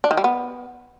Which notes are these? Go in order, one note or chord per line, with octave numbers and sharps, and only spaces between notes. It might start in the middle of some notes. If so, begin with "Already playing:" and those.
D4
D#3
G3
B3